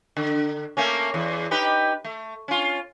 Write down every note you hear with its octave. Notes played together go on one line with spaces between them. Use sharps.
D3
A3 A#3 C#4
E2
D#4 G4 B4
A3
C#4 F4